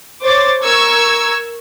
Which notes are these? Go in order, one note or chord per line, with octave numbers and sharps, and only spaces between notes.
C5 C#5 D6 A6
A#4 C#6 E6 G#6